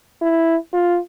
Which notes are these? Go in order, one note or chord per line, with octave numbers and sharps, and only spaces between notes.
E4
F4